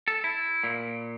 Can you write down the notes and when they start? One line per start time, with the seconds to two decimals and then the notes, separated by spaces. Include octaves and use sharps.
0.08 A4
0.24 E4
0.64 A#2